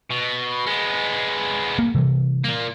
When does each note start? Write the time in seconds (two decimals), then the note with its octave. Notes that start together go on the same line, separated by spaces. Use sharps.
0.10 B2
0.67 G#3 B3
1.79 A#3
1.95 C3 E3 G3
2.44 A#2 A#3